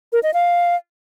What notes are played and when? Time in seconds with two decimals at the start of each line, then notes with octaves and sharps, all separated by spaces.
0.13 A#4
0.23 D#5
0.34 F5